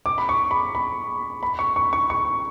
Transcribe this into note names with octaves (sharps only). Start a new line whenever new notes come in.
D6
B5
C#6
B5
B5
B5
C#6
C#6
C#6
C#6